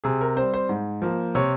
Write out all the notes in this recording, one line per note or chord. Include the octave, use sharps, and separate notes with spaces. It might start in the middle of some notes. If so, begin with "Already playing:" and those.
C3 G#4
A#4
G3 C4 C5
C5
G#2
F3 A#3
C3 C#5